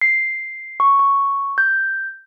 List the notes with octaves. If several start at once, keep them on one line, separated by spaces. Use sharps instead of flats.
C7
C#6
C#6
G6